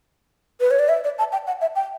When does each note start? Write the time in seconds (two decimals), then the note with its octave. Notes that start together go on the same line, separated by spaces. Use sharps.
0.60 B4
0.71 C#5
0.79 D5
0.89 E5
1.04 D5
1.19 A5
1.32 G5
1.47 F#5
1.61 E5
1.76 G5